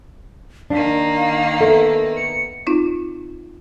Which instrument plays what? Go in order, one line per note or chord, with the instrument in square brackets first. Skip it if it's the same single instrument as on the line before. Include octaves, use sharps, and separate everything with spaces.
[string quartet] D#3 A#3 [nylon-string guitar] D4 [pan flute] F5
[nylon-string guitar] B3 E5 [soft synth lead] A4
[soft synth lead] C#7
[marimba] C4 D#4 F4